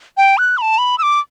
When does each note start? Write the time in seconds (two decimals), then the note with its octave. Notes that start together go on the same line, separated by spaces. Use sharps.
0.17 G5
0.38 F#6
0.58 B5
0.62 A5
0.78 B5
0.98 E6
1.03 D6